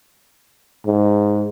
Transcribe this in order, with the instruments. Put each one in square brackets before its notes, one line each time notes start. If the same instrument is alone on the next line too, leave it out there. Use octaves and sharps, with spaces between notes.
[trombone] G#2